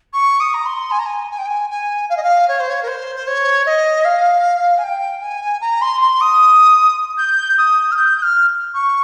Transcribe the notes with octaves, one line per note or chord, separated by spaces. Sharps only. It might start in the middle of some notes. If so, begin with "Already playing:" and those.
C#6
D#6
A#5
C6
G#5
A#5
G#5
G#5
G5
G#5
G#5
F5
D#5
F5
C#5
C5
C#5
A#4
C5
C5
C#5
D#5
F5
G#5
G5
G#5
A#5
C6
C6
D#6
G6
D#6
F6
G6
G6
F6
C#6